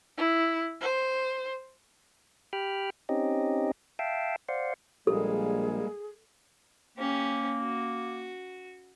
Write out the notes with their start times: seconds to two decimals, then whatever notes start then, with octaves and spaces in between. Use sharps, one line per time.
0.17 E4
0.81 C5
2.53 G4 G5 B5 F6
3.09 C4 C#4 D#4 G4 D#5
3.99 E5 F5 G5 A5
4.49 C5 D5 F5 F#5
5.07 A#1 G3 G#3 A#3 G#4 A4
6.98 A#3 C#4 G4
7.60 F#4